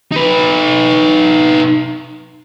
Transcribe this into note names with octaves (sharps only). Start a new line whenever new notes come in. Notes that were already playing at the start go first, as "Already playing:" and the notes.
D#4 B4